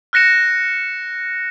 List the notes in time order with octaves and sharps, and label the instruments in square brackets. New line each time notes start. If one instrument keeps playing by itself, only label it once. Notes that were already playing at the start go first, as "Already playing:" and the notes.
[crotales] F6 F#6 A#6 C#7 E7